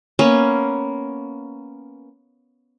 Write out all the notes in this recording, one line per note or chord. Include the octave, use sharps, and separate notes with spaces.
A#3 B3 C#4